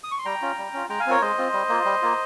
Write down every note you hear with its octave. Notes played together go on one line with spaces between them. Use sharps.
D#6
C#6
C6
G3 G5 A#5
C#4 F4
G3
C#4 F4
G#3 G5 A#5
F5 G#5
C4 F4 A#4 C#5
G#3 C5 D#5
C4 F4
G3
A#3 F4
G3
A#3 F4